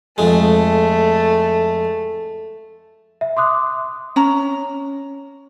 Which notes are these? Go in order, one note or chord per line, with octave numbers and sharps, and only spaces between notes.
F2 G#3 A3
E5
C6 D6 D#6 F#6
C#4 A#5